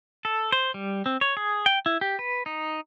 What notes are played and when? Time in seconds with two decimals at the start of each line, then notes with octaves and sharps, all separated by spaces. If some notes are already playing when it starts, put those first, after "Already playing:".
0.25 A4
0.52 C5
0.74 G3
1.06 C4
1.21 C#5
1.37 G#4
1.66 G5
1.86 E4
2.01 G4
2.19 B4
2.46 D#4